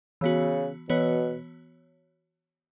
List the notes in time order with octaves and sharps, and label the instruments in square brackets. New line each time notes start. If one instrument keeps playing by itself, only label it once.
[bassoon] C#3 [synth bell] E3 B3 F#4
[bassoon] B2 [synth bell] E3 B3 F#4 C#5